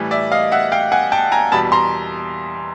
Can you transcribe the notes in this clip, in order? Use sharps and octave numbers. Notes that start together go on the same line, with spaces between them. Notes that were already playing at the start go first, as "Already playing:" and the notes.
Already playing: A2 E3 G3
D5 E5
D#5 F5
E5 F#5
F5 G5
F#5 G#5
G5 A5
G#5 A#5
E2 B2 G3 A5 B5
A#5 C6